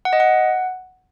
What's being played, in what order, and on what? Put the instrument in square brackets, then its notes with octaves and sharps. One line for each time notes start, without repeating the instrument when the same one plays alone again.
[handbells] F#5
D#5
F#5